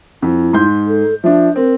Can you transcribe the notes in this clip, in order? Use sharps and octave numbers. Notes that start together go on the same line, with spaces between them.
F2 E4
G#2 C6 G6
A4
F3 D4 E5
C4 A#4